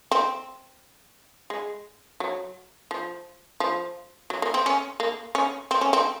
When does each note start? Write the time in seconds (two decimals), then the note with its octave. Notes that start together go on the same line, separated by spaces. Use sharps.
0.11 C4
1.50 G#3
2.20 F#3
2.91 F3
3.60 F3
4.30 F#3
4.42 A#3
4.54 C4
4.66 C#4
5.00 A#3
5.35 C#4
5.71 C4
5.81 C#4
5.93 C4